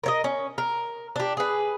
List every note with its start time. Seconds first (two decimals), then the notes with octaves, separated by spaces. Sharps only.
0.03 A#4 C#5 D#5
0.24 C#4
0.58 A#4
1.16 D4 G4
1.37 G#4 B4